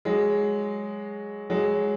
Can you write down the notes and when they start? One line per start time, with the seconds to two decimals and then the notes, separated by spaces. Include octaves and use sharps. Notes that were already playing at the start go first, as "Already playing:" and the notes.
0.05 F#3 G#3
1.50 F#3 G#3